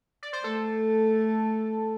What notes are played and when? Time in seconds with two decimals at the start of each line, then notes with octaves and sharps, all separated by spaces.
0.23 D5
0.33 C5
0.44 A3 A4